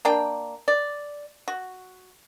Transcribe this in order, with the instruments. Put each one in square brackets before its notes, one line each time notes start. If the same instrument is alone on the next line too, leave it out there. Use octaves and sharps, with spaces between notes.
[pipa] A#3 D4 G5
D5
F#4